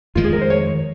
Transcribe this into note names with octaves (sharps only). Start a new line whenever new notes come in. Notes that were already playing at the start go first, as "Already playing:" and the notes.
F2 D#3 G#3 F4
G#4
A#4
C5
C#5